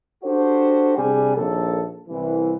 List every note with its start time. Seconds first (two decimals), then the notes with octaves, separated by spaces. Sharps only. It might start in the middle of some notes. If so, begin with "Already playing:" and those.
0.24 D4 F#4 G4 A4 C5
0.97 C3 G3 D4 G#4 G#5
1.36 A#1 D#2 A4
2.08 C2 E3